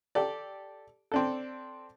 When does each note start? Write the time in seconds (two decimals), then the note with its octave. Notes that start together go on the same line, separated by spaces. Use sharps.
0.15 G4 A4 D5
1.12 C4 D4 A4